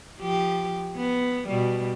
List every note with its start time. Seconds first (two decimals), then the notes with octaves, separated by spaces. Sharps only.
0.21 F3 G4
0.97 B3
1.48 B2 G3